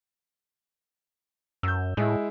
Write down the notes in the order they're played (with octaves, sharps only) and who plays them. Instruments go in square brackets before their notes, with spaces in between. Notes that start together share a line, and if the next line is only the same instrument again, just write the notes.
[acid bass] F#2 [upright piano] E6 G6
[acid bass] A2 [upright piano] G#3 E4